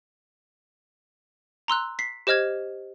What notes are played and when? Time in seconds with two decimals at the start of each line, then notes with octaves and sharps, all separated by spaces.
1.68 A#5 C6 E6 F#6
1.99 B6 C7
2.27 G4 C5 D#5 F6 G#6